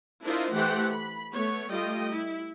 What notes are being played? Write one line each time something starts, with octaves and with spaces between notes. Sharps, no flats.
D4 E4 F4 A#4 C5 D#5
E3 A3 G4 C5 F#5 G5
B5
A3 B3 C#5
G3 A3 F4 D#5 G5
E4